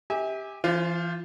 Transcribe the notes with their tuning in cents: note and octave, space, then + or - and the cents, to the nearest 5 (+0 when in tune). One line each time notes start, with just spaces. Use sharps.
G4 +10 E5 -35 G#5 -15
E3 +40 F4 +0 C5 +0